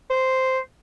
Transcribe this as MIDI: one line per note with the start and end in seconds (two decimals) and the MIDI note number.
0.10 0.59 72